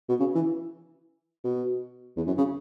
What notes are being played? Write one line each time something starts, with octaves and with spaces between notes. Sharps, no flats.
B2
C#3
E3
B2
E2
F#2
C#3